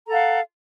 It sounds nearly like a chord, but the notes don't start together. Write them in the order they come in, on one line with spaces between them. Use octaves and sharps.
A#5 A4 F#5 F5